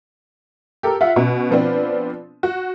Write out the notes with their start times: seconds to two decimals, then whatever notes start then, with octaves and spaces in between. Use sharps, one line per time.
0.83 G4 A4 A#4
1.01 F4 E5 F#5
1.16 B2 C#4 F#4
1.51 F3 B3 C4 D4
2.43 F#4